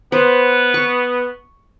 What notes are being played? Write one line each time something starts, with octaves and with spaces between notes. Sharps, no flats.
B3 C5
C#6